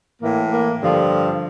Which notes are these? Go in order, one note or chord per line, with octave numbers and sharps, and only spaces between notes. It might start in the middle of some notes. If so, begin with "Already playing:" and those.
A2 E3 A#3
A#3
G2 D3 F3